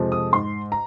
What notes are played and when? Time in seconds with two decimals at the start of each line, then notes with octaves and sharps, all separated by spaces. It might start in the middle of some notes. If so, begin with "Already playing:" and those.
Already playing: F2 C3 F3 G#3
0.12 D#6
0.33 G#2 C6
0.72 A#5